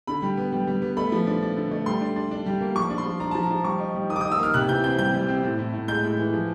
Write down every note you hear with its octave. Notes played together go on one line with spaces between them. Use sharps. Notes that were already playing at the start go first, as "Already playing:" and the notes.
D3 B5
G3
B3
G3
G3
B3
A3 B5
F3
D4
D4
D3
A3
G3 C6
D4
D4
D4
G3
A#3
F3 C#6
D4
C6
F3
D4 A#5
F3 A5
A#5
F3
G3 C#6
D#4
G3
D#3 D#6
D6
D#6
D#4
E6
A#3 F6
C3 F#6
E3 G6
C4 G6
G3 G6
G3
C4
A2
A2
A2
G#3 G6
A2
E3
F3